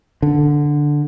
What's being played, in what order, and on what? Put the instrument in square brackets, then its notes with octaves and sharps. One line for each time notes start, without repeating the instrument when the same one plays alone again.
[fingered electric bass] D3